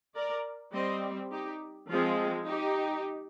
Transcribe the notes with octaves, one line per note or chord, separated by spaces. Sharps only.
A#4 D5
G3 C4 C5 D#5
D#4 G4
F3 G#3 C4 F4 G#4
D#4 G4